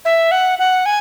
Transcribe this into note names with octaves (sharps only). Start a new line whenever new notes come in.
E5
F#5
F#5
G#5